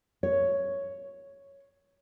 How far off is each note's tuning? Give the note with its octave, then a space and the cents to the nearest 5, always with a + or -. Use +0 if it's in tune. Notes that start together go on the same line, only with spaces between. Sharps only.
C#5 +5